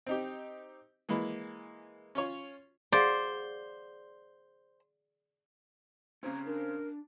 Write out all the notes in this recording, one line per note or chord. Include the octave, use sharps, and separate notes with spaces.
C4 D#4 G4
E3 G#3 A#3 B5
C#4 F4 C#5
G#4 C5 D5 F5 F#5
C#3 C4 C#4 G#4 A#5
D4 A#4